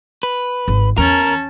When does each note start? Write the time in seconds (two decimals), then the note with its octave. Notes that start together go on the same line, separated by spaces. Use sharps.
0.23 B4
0.68 G#1
0.98 E2 C#4 A#4 A5